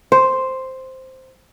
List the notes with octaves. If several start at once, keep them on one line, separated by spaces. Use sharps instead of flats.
C5